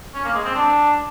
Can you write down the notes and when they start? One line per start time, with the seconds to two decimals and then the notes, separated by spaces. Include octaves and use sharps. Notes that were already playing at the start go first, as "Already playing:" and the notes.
0.14 C#4
0.25 A#3
0.35 G#3
0.45 C4
0.55 D4